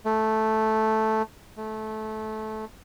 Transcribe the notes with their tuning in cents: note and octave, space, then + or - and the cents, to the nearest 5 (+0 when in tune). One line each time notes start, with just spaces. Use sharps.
A3 -5
A3 -20